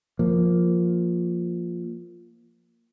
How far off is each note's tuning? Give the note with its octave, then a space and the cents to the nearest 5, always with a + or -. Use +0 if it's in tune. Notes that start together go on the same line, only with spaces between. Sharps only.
F3 +0 A#3 +0